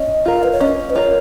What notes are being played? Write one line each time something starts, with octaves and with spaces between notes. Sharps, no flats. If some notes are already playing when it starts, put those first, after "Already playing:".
Already playing: C#4 D#5
F4 A#4 F5
B4
C#5
C#4 D#5
B4
F4 A#4 C#5